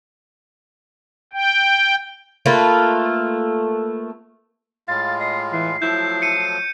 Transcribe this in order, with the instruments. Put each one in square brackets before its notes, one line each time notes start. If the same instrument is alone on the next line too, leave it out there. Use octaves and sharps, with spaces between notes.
[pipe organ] G5
[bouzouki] A3 A#3 F4 B4
[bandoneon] A2 G#3 F4 [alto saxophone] F5 [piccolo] A6
[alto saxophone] D#5 [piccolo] C7
[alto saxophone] E3 [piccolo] C7
[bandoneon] F3 F#3 A3 [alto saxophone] E4 [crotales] G6
[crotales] C#7 D#7